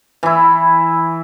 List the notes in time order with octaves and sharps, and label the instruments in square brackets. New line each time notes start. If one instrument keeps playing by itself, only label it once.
[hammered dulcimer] E3 E4